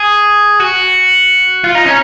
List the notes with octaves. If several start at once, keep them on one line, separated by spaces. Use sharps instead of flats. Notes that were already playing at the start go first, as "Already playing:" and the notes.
Already playing: G#4
F#4
F4
D#4
C#4